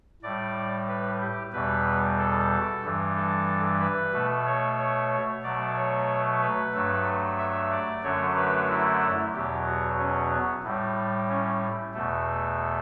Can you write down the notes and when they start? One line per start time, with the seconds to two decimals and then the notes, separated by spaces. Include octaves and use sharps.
0.22 A2 G3 D5
0.88 B4
1.20 G4
1.52 E2 B2 G3 B4
2.18 A4
2.83 G2 E3 G3
3.16 A4
3.80 B4
4.13 B2 A3
4.46 C#5
4.78 C#5
5.43 B2 F#3 A3 D5
5.76 C#5
6.41 B4
6.73 G2 F#3 A3
7.38 E5
7.71 D5
8.03 F#2 D3 F#3 A3 C#5
8.36 B4
8.68 E4
9.33 E2 B2 F#3 G4
9.66 F#4
9.99 C#4
10.31 B3
10.64 A2 G3
11.29 C#4
11.94 E2 B2 A3